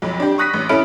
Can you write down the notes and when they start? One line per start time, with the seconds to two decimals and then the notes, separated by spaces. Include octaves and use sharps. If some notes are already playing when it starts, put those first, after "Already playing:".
0.02 B1 F2
0.20 D4 G4
0.38 C#6 D#6 F#6 A#6 B6 D#7
0.53 A1
0.69 C#4 E4 A4 B5 F6 D7